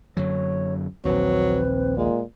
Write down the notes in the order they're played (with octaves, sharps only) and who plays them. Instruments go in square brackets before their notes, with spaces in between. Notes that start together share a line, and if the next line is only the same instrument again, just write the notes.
[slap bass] F#2 D3 F#3 [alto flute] C#5
[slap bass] A#1 D#2 [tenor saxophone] F#3 [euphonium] C4 [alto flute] B4
[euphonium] A#2 [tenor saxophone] G#3